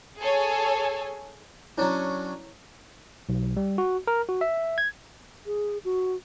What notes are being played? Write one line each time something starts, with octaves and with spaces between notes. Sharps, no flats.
G#4 A4 C#5 G#5
F#3 C#4 D4 E4 C#5 A#5
B1
G3
F#4
A#4
F#4
E5
G#6
G#4
F#4